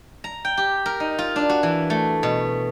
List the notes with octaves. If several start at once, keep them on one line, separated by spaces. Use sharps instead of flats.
A#5
G5
G4
A#4
D#4
F4
D4
F#4
E3
A3
B2